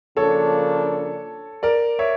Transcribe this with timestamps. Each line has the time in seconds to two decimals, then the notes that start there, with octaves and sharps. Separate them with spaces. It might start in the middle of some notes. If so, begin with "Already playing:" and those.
0.17 C#3 F3 A#3 D4 A4 C#5
1.63 A#4 D5
1.99 C#5 E5